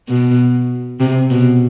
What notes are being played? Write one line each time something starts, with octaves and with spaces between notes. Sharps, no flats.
B2
C3
B2